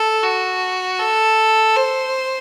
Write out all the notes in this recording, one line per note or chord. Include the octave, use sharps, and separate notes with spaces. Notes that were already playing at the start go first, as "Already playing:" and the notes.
Already playing: A4
F#4
A4
C5